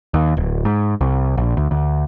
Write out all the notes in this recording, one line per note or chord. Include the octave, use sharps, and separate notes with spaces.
D#2
D1
G#2
C2
A#1
D2
D2